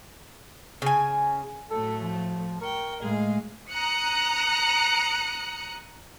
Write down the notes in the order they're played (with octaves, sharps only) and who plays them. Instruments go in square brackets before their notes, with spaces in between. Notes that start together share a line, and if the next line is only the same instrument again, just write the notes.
[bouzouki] C#3 G#5
[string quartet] A2 F#3 A3 [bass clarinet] A4
[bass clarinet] F3
[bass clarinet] A#4 [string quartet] G5 C#6
[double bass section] A2 G#3 [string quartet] G#4 F5
[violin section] A#5 D#6 F#6 C#7